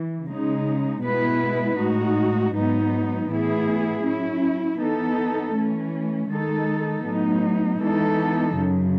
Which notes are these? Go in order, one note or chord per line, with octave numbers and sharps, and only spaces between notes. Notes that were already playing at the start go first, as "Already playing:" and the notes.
Already playing: E3
C#3 G#3 D#4
B2 G#3 B3 E4 B4
A2 G#3 D#4 F#4
G#2 F#3 B3 D#4
A2 E3 B3 E4 G#4
F#3 C#4 E4
E3 B3 D#4 A4
E3 A3 C#4
D#3 G#3 D#4 A4
A2 F#3 B3 D#4
E3 G#3 B3 D#4 A4
F#2 C#3 F#3